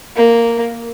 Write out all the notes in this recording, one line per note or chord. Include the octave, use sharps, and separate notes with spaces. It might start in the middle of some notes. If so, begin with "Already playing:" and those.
A#3